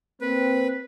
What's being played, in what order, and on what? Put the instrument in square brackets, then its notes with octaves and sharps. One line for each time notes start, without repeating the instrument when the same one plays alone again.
[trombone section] A#3 C4 [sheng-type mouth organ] B4